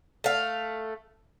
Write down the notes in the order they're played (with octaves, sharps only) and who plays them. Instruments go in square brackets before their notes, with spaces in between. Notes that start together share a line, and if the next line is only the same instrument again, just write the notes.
[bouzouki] A3 F5